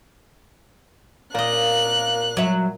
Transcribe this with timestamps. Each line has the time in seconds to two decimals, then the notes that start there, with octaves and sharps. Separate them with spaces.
1.35 A#2 A#3 D#5 F#6
2.37 F#3 E5